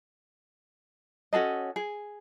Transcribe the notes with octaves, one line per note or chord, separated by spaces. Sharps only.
C#4 F#4 A4 D#5
G#4